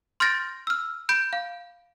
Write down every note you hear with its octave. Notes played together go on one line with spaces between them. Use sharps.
C6 F6 G6 A6 A#6 D7
E6 F6
B5 G6 D7
F5